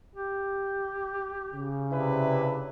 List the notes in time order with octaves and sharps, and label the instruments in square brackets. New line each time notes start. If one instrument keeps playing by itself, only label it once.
[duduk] G4
[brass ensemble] C#3
[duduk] C3 [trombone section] D4 E4 B4